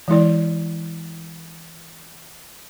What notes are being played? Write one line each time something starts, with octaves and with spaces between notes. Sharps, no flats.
E3 G#3 E4 D5